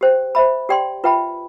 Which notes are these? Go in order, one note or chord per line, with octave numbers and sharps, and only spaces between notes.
G4 C5 G5
C5 E5 B5
G4 D5 G5 C6
F4 B4 E5 G5 B5